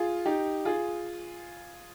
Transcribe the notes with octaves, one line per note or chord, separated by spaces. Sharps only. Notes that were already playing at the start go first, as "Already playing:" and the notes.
Already playing: F4 G#4
D#4 G4
F4 G#4